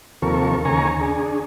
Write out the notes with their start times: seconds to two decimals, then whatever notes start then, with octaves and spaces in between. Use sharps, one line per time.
0.22 D#2 C3 F3 A4 A#4 C#6
0.65 D#2 C#3 G#5 A#5 C#6
1.00 D4 G#4